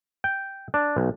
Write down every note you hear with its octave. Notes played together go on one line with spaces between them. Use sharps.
G5
D4
B1